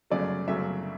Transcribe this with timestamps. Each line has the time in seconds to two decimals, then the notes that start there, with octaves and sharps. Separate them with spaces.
0.10 G1 F#2 C#3 F#3 A3 D5
0.48 G1 F#2 C#3 F#3 A3 E5